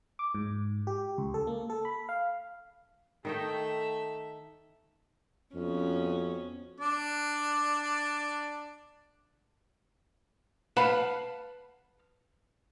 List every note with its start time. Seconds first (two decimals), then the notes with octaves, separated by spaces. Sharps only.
0.19 D6
0.34 G#2
0.87 G4
1.18 C#2
1.34 A4
1.47 A#3
1.70 A4
1.85 B5
2.09 F5
3.25 D#3 A3 D#4 E5 G5
5.55 F2 B3 C#4 F#4
6.80 D4 D5
10.77 B4 F5 F#5 A5 B5